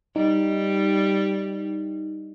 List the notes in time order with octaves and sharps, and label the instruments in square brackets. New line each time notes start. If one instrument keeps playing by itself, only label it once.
[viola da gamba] G3 [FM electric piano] D#4